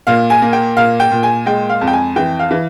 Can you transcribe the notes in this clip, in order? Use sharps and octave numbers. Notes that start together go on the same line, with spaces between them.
A#2 F5
G#5
A#3
G5
A#2 F5
G5
A#2
G#5
G#3 G5
F5
F2
G5
G#5
E3 G5
F5
E3